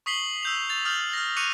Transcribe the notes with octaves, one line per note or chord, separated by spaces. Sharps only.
C#6 D#6 B6 C7 F#7 G7
E6 G6 F7
A6 F7
D#6 F6 G6 A6 F#7
F6 A#6
C#6 D6 F#6 C#7 D#7 F7